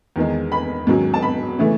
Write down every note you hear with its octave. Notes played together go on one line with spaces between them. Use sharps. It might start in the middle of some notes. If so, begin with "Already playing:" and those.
E2 D#3 G#3
B5
G#2 D#3 F#3 C#4
A5
B5
C#3 E3 A3 C#4